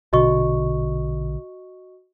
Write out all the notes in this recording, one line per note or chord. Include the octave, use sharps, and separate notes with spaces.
A#1 B2 D3 F#4 D#5 C#6